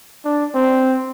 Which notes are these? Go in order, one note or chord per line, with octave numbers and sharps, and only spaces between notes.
D4
C4